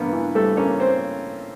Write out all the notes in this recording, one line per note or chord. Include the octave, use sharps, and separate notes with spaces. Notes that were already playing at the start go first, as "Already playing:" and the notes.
Already playing: G2 A#3 B3 B4
E3
G3 A3 A4
A#3 C#4 C#5
C4 C5